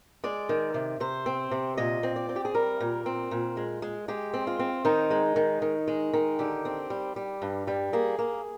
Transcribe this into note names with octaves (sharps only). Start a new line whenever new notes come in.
G#3 D5
D#3
C3
C3 C5
C4
C3
A#2 D#5
C4
D5
C4
G4
G#4
G3 A#4
A#2
C4
A#2
G#3
G#3
G#3 G4
C4
F4
C4
D#3 D#4
G#3
D#3
D#3
G#3
D#3
D3 G4
C4
G3
G3
G2
G3
A#3 G#4
A#3